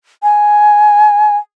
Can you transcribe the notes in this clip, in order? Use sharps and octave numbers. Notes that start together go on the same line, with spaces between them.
G#5